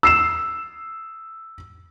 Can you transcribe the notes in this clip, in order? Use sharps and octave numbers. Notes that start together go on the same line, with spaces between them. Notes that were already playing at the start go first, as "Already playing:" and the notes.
E6 C7 E7